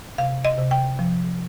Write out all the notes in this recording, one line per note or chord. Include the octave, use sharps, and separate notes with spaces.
C3 F5
D#5
C3
G5
F3